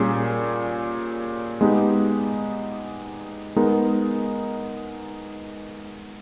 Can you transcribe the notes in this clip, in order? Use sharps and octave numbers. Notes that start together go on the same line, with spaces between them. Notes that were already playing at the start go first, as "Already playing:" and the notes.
Already playing: A#2 G3 C#4 G#4
G#3 B3 D#4 G4
G#3 B3 D#4 A#4